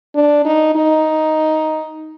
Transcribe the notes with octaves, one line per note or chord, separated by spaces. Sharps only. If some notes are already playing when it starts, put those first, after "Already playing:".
D4
D#4
D#4